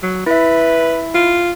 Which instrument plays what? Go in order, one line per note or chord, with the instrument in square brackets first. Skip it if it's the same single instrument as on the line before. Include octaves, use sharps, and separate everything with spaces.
[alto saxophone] F#3
[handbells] E4 E5 [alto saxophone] B4
[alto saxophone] F4